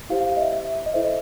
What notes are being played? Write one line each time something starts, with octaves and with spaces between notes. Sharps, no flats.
E4 G4 C5 F5
F5
F5
D#5
E5
E5
D#5
E4 A4 C5 E5
D#5